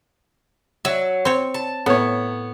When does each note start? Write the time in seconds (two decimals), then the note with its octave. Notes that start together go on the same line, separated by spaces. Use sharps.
0.85 F#3 E5
1.25 C4 C#5
1.54 A5
1.86 A2 B3 C#5